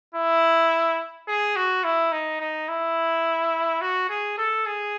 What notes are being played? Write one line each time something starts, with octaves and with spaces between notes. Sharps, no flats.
E4
G#4
F#4
E4
D#4
D#4
E4
F#4
G#4
A4
G#4